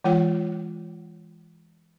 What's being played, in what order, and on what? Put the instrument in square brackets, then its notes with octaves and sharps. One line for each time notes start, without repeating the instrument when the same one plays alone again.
[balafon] E3 G#3 F4 C#5 F#5 G5